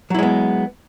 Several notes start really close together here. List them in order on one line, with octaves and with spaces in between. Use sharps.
F#3 E4 G#3 B3